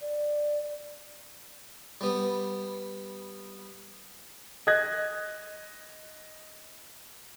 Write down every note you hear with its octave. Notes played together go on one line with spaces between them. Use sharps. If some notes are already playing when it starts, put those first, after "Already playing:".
D5
G3 B3
D#5 D#6 F#6 G#6 A#6